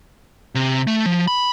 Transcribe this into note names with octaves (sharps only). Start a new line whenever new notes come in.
C3
A3
F3
B5